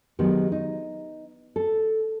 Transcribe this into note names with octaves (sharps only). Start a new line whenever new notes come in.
D#3 F#3 G#3 B3 G4
D#4
A4